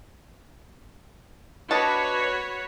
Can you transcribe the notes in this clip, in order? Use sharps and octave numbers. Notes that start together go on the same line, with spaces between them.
D4 F#4 B4 C#5 D#5 A5